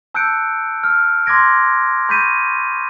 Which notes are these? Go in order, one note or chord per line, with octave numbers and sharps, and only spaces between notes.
A5 E6 F#6 G6 C#7 D7
F6
C6 D6 F6 G#6 A#6 D7
B5 C#6 G6 A6 B6 D#7